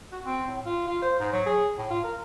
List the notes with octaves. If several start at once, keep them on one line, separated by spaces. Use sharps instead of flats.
F#4
C4
A2
F4
F4
C5
G#2
F#3
G#4
A2
F4
A#4